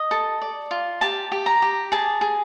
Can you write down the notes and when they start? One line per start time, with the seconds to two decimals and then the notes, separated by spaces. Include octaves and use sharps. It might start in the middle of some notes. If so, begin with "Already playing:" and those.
Already playing: D#5
0.11 A4
0.42 D5
0.71 F4
1.01 G4 A5
1.32 G4
1.46 A#5
1.62 G4
1.92 G#4 A5
2.21 G#4